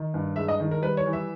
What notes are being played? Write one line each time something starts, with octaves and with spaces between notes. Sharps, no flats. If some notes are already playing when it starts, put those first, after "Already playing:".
Already playing: D#3
G2
G#3 E5
D#5
D#3
A#4
G3 B4
C#5
E3
E5